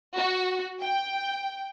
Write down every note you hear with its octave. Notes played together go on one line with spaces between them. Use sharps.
F#4
G5